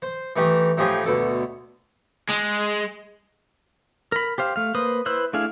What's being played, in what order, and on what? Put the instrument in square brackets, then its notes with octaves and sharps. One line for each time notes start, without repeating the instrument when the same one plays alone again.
[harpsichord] C5
E3 A3 D#4 G4
A2 F3 D#4 F4 G4 G#4
D2 B2 A4 D6
[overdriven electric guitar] G#3
[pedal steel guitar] A#4 B5
G4 C5 F5
A3 F5
A#3 B4 C5 D#6
E4 B4 C5 E6
A3 D4 E4 G#4 F5